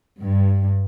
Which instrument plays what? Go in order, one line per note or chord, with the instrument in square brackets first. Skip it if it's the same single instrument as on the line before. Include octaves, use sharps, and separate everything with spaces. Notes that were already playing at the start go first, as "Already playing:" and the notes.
[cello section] G2